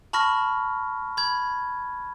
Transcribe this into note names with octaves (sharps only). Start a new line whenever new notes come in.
A5 B5 C#6 F6 A#6
B5 G#6